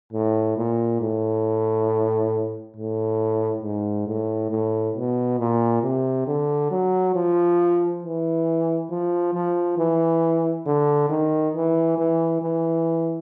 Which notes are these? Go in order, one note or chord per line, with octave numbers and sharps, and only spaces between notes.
A2
A#2
A2
A2
G#2
A2
A2
B2
A#2
C3
D3
F#3
F3
E3
F3
F3
E3
D3
D#3
E3
E3
E3